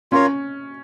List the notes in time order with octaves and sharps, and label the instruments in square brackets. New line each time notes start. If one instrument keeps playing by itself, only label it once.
[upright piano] C#4 [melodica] F4 A#4 C#5 F5